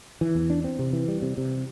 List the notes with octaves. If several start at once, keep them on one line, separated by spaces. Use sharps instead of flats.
E3
E2
D4
C4
C3
E3
G3
C3
C3